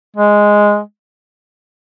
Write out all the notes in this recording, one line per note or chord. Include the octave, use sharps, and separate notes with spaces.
G#3